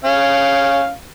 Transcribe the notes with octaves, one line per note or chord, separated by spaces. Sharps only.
C#4 F5